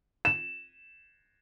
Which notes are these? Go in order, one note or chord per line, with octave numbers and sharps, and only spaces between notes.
E7